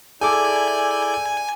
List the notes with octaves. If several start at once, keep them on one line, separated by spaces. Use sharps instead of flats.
E4 G#4 A4 D5 G#5 D6 G6